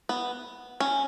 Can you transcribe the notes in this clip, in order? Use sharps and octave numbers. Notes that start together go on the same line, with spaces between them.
B3
C#4